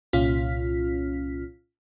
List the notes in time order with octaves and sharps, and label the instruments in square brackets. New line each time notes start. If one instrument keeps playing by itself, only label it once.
[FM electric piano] C2 A#2 C#4 F4 F6 B6